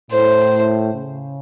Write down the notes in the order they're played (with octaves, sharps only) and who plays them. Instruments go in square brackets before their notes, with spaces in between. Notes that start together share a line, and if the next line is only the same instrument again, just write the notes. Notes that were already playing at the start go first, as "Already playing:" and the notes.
[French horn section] A2 [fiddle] C5
[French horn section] C#3